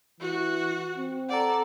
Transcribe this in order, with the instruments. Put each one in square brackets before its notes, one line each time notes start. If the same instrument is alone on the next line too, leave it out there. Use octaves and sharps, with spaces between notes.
[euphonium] E3 [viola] F#4
[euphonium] C4
[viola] A4 D5 [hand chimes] F#5 A#5